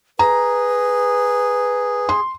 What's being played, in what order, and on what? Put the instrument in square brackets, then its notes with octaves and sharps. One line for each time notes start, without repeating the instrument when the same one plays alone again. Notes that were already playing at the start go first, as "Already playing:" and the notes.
[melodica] G#4 [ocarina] B4 [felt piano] A#5
[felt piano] C6